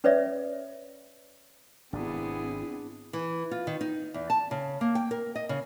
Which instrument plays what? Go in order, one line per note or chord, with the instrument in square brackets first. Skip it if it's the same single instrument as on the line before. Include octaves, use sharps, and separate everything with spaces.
[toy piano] C#4 B4 C#5 D5 E5
[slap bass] G#1 C3 [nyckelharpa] B3 G#4 [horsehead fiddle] C4 E4 [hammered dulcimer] D4
[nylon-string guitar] E3
F4
D#3
D#4
E2
A5
C#3
A#3
G5
A#4
D#5
C#3